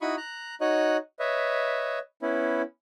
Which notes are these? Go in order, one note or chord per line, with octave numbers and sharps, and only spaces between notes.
D#4 E4 F#4 B5 C#6 D#6
A#5 F#6
D#4 F#4 C#5 D#5 F#6
B4 C#5 D#5 E5
B3 C#4 E4